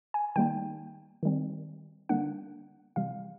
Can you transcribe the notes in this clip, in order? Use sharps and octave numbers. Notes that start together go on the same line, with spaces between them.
G#5
D#3 G3 A#3 D#4 G5
D#3 G3 C4
D3 G3 A#3 D4 F#5
C3 E3 G3 F5